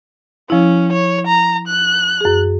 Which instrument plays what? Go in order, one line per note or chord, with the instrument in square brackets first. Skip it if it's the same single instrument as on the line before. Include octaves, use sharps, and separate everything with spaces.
[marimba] F3 E4 [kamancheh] C#4
[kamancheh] C#5
A#5
F#6
[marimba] F#2 G#4